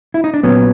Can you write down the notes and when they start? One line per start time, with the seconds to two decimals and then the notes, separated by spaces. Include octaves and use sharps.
0.14 E4
0.24 D#4
0.34 D4
0.43 A#2 F#3 B3 C#4